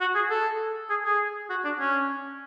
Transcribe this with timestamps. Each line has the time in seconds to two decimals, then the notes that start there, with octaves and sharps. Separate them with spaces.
0.01 F#4
0.15 G#4
0.30 A4
0.90 G#4
1.05 G#4
1.50 F#4
1.65 D4
1.79 C#4